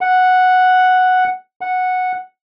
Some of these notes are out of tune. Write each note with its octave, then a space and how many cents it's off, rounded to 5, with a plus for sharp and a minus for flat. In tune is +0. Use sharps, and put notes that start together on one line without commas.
F#5 -5
F#5 -10